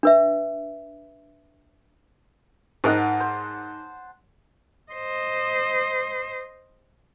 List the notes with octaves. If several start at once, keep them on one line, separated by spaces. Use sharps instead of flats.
D4 B4 E5
G#2 A#4 D#5 F#5 A5
C5
C5 D#5